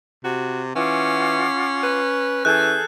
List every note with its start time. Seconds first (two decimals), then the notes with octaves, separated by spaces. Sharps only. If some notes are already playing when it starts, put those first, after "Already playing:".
0.24 C3 F#4
0.75 E3 C#4 F4 F#5 D6
1.83 B4
2.45 E3 G#4 A4 F#6 G6